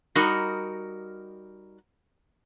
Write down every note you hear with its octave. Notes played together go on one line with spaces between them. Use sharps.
G3 D#4 F#4 A#4 D#5